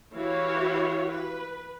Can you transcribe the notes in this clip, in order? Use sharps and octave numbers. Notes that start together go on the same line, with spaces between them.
E3 E4 F#4 G4 C#5 F5
B4